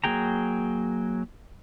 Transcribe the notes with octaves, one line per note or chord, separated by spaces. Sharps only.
F#3 A#3 G#4 G5 A#5